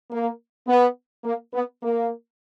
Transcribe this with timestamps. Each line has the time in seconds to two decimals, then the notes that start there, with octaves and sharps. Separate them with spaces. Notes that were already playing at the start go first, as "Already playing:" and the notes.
0.11 A#3
0.68 B3
1.24 A#3
1.53 B3
1.81 A#3